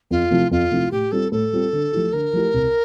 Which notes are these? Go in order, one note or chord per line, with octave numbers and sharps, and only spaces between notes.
F2 F4
C3 F3 A3 E4
F2 F4
C3 F3 A3 E4
A2 G4
G3 C4 F4 A4
A2 A4
G3 C4 F4
D3
F3 A3 E4 G4
D3 A#4
F3 A3 E4 G4
C2